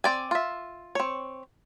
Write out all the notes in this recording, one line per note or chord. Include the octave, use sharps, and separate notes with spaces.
C4 D5 G#5
F4 E5
C4 C#5